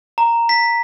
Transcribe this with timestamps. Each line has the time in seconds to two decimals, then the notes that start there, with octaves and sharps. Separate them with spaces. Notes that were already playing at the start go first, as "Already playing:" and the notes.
0.18 A#5
0.49 B6